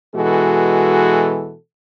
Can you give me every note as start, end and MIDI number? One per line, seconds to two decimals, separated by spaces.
0.15 1.55 47
0.15 1.55 52
0.15 1.55 56
0.15 1.55 66
0.15 1.55 69